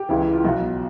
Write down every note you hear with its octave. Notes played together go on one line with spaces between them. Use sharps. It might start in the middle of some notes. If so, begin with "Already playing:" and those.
Already playing: G4
C#2 C#3 E3
F4
B1 B2 F#4